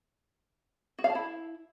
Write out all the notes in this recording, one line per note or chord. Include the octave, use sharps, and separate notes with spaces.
F#4
F5
A5
E4